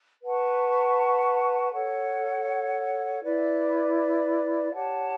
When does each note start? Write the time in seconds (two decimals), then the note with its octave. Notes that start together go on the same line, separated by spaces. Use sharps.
0.23 B4 F#5 A5 C#6
1.73 A4 C#5 F#5
3.23 E4 B4 D5
4.72 G4 C#5 F#5 A5